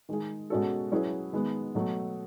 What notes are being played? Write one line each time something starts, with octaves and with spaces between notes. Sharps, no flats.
D#3 G#3 D#4 G#4
B2 G#3 C#4 F#4 A4
F#3 C#4 E4 G#4 B4
D#3 G#3 B3
B2 F#3 A3